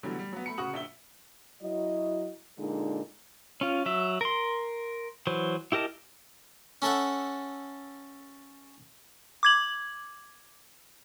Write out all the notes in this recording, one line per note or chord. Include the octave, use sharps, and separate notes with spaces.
B2 D3 E3 F#3 G3 A3
G3
F#3 B3
A3 B5 C#7
D1 C#3 F#4 C#6 D#6 F#7
A#1 E5 G7
F#3 E4 D#5
A#2 D3 G#3 D#4
C#4 F4
F#3 E5
A#4 C6
E3 F#3 C5
E4 G4 A#4 D#5 A5
C#4 A4 E5 F#5
D6 G#6 F#7